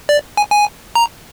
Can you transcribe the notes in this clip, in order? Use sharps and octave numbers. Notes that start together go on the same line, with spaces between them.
D5
G#5
G#5
A#5